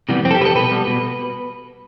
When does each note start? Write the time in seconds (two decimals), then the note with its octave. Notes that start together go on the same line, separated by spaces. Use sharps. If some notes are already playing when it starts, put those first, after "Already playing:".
0.09 C3 E3 G3 B3
0.25 F2 C4
0.31 A4
0.35 G4
0.40 C3 E3 G3 B3 B4
0.45 A4
0.55 B2 B4
0.71 G3 B3
0.87 B2